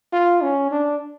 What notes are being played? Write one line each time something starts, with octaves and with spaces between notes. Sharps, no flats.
F4
C#4
D4